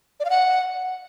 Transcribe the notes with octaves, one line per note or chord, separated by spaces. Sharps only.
D5
F5
F#5